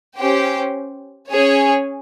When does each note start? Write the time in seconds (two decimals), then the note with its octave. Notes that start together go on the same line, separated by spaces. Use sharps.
0.18 C#4 G4 C5 G5
1.31 C#4 G#4 C#5 G#5